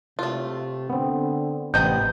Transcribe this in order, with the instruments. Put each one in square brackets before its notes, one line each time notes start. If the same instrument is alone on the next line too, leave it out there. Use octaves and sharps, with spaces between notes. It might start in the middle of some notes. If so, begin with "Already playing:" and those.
[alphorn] C3 [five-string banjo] A3 F4
[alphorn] D3 [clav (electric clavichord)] B3 C4
[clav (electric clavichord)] A1 C4 G5 [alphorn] C3 [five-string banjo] B3 D#5 A#5 [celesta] G6